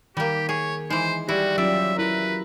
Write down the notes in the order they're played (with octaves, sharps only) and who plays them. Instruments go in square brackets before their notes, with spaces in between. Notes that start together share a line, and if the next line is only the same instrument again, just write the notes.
[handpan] D#3 [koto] G3 A#3 [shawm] G4
[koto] G#4 [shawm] C#5
[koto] E3 G#3 [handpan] D#4 [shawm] C5
[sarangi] G3 [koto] E4 [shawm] F#4 [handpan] G4
[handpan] F#3 C#4 F4 [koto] D5 [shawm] E5
[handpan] E4 [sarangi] A#4 [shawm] B4